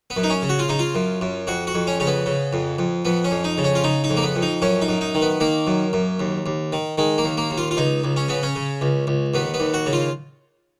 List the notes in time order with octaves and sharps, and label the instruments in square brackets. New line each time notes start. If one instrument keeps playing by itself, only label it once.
[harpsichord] B3
F#2
D#4
C#4
C#3
F#4
F4
C#3 D#4
F4
F#2
F#2
F2 F#4
F#4
F2
C#4
C#3 C#4
B3
C#3
F2
F2
F2 B3
C#4
F2
D#4
C#3
C#4
F4
C#3 D#4
D#4
F2
A#3
B3
F2
D#4
F#2 C#4
D#4
F#2
D#4
D#3
B3
D#3 A#3
F#2
F#2
D#2
D#2
D#3
D#3 G#3
A#3
D#2
A#3
D#2
F4
F4
C#2 D#4
C#2
C#4
C#3 B3
C#4
C#3
C#2
C#2
D#2 B3
B3
D#2
F#4
C#3
F4